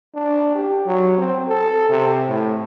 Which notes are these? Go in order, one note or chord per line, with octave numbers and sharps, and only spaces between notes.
D4
G4
F#3
C4
A4
C3
A2